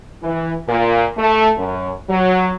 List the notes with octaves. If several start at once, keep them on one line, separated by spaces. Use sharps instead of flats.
E3
A#2
A3
F#2
F#3